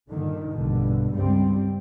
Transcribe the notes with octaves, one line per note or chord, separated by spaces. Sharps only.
G2 A#2 D3 D#3
A#1 G2 B2 D3
G1 C#2 G2 G3 C4